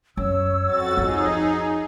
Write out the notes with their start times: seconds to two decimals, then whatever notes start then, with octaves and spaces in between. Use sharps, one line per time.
0.17 F#2 C#5 E6
0.65 F2 F#4 A6
0.97 F3 D#4 G#4